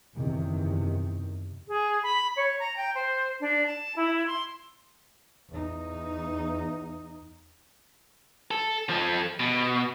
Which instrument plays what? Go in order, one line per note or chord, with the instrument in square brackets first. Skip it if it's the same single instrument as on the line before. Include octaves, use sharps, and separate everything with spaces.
[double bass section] F#1 E2 C3 D#3
[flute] G#4
B5
C#5
A#5
G5
C5
D4
A5
E4
C6
[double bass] E2 D#4
[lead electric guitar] A4
F3 A4
B2